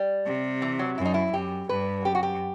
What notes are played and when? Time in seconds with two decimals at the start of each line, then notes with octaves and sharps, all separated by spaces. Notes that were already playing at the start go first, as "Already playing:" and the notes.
Already playing: G3
0.25 C3
0.62 E3
0.79 F#3
0.97 F#2 E4
1.05 D#4
1.14 E4
1.32 F#2 G4
1.69 G2 B4
2.04 F#2 G4
2.15 F#4
2.23 G4